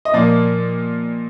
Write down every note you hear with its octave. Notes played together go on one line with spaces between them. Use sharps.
D#5
A#2 F3 A#3 D5